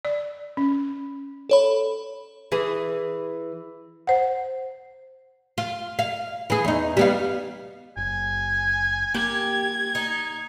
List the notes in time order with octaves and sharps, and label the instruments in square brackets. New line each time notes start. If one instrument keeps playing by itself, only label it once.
[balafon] D5
C#4
[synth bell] A4 C#5 B5
[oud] E3 G#4
[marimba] C5 F#5
[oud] F4
F5
E3 G#4
E2 D#4
G3 B3 F5
[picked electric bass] F#1 [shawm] G#5
[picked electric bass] A#3 [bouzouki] G4 [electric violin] G#6
[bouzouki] D#4